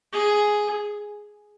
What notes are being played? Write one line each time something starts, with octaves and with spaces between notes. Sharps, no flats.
G#4